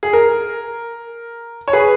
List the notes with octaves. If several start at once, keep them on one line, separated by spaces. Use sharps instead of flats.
G#4
A#4
C#5
G#4 B4